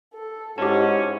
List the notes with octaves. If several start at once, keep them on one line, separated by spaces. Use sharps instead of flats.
A4
G#2 C#4 E4 F#4 G4 A5